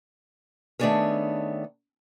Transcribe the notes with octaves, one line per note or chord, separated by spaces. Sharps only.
D#3 A3 B3 D4 G#4 C#5